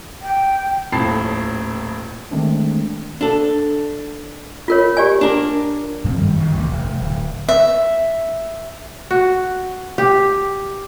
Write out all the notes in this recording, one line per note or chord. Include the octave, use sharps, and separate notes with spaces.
G5
D#1 A2 F3 A5 B5 C7
D#3 G#3 A3 C4 D4
D4 A4
F4 A#4 C#5
G4 D5 G#5
D4 A#4
G2 F3 A#3 C4
F#2 D#3 G3
D2 G2 D#3
A1 D#2 C3
F1
D1
E5
F#4
G4